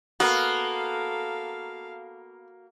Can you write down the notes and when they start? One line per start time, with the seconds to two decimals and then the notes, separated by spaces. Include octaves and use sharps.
0.20 A#3 B3 F#4 A4 F5